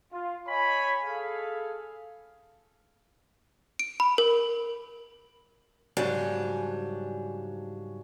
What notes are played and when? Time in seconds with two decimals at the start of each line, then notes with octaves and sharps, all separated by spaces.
0.12 F4
0.48 C#5 D#5 G#5 B5
1.04 G#4 A4 F5
3.79 D7
4.00 B5
4.18 A#4
5.97 G#2 C#3 F#3 G3 D4